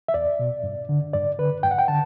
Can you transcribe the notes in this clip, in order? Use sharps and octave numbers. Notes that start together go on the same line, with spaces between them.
E5
E2 D5
B2
G2
D3
G2 D5
D3 B4
G2 G5
F#5
G5
D3 A5